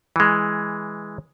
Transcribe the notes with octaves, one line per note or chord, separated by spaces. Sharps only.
E3 G#3